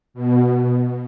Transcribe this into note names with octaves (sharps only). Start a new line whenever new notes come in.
B2